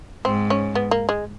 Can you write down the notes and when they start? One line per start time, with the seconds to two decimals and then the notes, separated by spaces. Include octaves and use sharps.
0.25 G#2 C4
0.50 C#4
0.75 B3
0.91 A#3
1.09 G#3